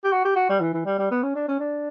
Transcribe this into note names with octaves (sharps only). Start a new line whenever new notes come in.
G4
F#4
G4
F#4
G3
E3
E3
G3
G3
B3
C#4
D4
C#4
D4